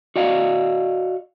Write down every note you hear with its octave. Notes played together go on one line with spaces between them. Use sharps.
F#4 D5 D#5 F5